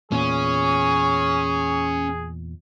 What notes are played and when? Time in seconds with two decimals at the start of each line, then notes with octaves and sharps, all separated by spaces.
0.12 E2 A#2 C#4 G#4 C#6